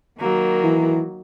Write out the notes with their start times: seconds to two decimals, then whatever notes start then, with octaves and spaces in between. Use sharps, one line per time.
0.19 D#3 F#3 A#3
0.64 E3